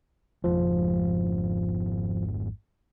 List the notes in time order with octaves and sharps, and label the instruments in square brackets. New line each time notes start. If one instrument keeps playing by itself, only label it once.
[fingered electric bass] G#1 F2 G#2 [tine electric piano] F3